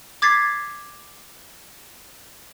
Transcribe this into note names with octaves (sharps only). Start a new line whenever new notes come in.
D6 G#6 A6 B6 C7